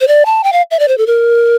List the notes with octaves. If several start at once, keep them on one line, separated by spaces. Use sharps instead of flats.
C5
D5
A5
G5
F5
E5
D5
C5
A4
A#4